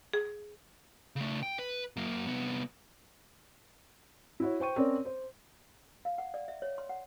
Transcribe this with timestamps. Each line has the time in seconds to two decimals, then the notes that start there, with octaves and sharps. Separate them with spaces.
0.13 G#4
1.16 C#3 A3
1.43 G5
1.59 B4
1.96 F#2 A#3
2.27 C2 B3
4.40 E4 F#4 C#5
4.60 C5 G5 C#6 D#7
4.76 C4 C#4 A#4 C#5 D5
5.05 C5
6.05 F5
6.18 F#5
6.34 D5
6.48 E5
6.62 C#5
6.78 C6
6.89 F#5